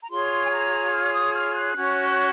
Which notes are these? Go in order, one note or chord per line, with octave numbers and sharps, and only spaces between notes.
A#5
F4 G#4 C#5 C6
G#5
A#5
F6
D#6
F6
F#6
C#4 F#4 C#5